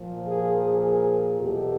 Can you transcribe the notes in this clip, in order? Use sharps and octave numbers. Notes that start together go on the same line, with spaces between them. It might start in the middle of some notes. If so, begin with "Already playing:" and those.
Already playing: A#2 F3
G#4 A#4
G#4 A#4
E2 B2 F#3 G4 A4